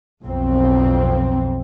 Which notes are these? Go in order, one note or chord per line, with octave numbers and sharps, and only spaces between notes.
B1 F2 C4